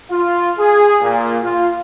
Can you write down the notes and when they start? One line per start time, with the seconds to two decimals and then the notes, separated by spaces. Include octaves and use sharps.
0.11 F4
0.58 G#4
1.02 A#2
1.43 F4